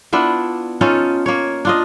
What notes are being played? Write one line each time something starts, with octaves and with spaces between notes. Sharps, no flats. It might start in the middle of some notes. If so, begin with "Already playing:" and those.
B3 D4 E4 F4
C#4 D#4 F4 A4
A#3 C#5
D4 F4 D#5